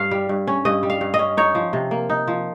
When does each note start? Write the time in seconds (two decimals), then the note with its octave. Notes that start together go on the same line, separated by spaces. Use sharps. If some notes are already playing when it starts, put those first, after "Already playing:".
Already playing: G2 F5
0.11 G3
0.29 G2
0.47 C#4
0.65 G2 D#5
0.83 G3
0.90 F5
1.01 G2
1.14 D#5
1.19 C#4
1.37 D#4 C#5
1.55 F3
1.73 C3
1.91 A#3
2.10 D#4
2.28 F3